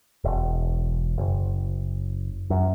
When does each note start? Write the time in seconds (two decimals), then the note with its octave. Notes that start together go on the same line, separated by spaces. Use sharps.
0.24 E1
1.18 F#1
2.50 F#2